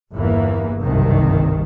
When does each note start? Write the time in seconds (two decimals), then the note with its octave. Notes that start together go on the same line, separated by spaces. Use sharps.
0.13 G1 E2 E3 A#3
0.82 F#1 C2 G2 D#3